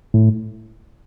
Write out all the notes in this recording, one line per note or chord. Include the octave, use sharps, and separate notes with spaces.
A2